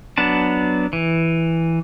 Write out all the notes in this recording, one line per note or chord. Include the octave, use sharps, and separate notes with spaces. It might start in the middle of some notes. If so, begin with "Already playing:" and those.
F#3 B3 D4 A5
E3